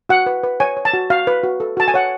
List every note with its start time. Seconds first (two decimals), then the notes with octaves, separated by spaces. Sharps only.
0.09 F#4 F#5
0.26 B4
0.43 B4
0.60 C#5 G#5
0.77 C#5
0.85 A5
0.93 F#4
1.10 F#4 F5
1.27 B4
1.43 F#4
1.60 A4
1.77 F#4 A5
1.88 G#5
1.94 C#5 F#5